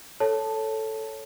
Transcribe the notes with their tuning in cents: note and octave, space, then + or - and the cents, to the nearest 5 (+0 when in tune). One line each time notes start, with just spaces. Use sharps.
A4 +0 C#5 +0 A5 +0